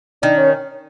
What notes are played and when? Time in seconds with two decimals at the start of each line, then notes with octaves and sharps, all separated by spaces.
0.22 D#3 D4
0.37 C#4